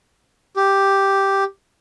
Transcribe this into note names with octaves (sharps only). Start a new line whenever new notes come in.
G4